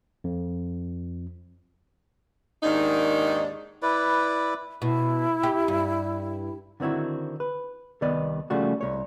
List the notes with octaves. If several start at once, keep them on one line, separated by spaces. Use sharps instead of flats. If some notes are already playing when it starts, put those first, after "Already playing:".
F2
D#2 G#2 D#3 D4 D#4
E4 B4 D5
B2 E4
G4
G2
D3 D#3 C4 E4 F#4
B4
C2 D#3 B3 D5 D#5
C#3 F3 G3 A3 F4 F#4
C2 C#5